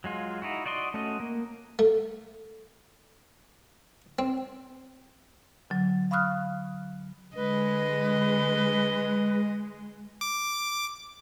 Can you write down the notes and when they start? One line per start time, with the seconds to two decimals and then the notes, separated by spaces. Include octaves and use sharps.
0.04 F#3 G#3 F4
0.42 D#4 E4 F#4
0.66 F#4 D5 D#5 C6
0.94 A3 C#4 F#4 D#5
1.20 A#3
1.79 A3
4.19 C4
5.70 D3 F#3
6.11 F5 B5 C#6 D#6 F6 F#6
7.36 D3 G#3 B4 D#5
10.21 D6